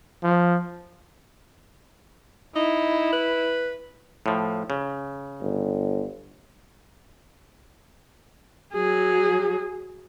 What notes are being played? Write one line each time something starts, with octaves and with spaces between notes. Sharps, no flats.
F3
D#4 E4
B4
A2 F3
C#3
G1
F#3 G#4